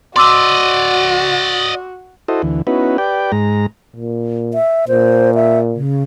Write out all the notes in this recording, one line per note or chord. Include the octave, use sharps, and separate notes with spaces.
F#4 D5 D#5 C6 D6 E6
E4 F#4 A4 C5 D#5
D2 E3
B3 C#4 D#4 E4 F#4 B4
G4 B4 D5 G5
G#2 G#3 A#5
A#2
E5
A#2 C5
E5
C#3